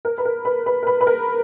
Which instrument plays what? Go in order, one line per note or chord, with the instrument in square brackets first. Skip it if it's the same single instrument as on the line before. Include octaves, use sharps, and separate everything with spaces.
[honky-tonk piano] A#4
B4
A#4
B4
B4
A#4
B4
B4
A#4